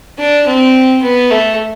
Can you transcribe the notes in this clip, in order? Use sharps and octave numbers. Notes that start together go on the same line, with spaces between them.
D4
C4
B3
A3